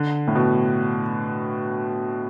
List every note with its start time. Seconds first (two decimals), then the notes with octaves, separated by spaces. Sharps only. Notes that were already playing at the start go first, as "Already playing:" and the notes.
Already playing: D3
0.28 A2
0.35 B2